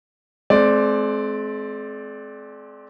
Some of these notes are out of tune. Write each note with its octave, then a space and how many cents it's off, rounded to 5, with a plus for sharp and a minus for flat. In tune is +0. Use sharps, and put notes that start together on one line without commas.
G#3 +45 C4 +0 D5 +0